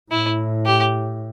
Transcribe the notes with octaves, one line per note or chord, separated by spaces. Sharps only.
A2 E4
G4